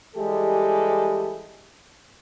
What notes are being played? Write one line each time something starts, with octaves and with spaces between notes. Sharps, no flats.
E3 G3 G#3 G4 A4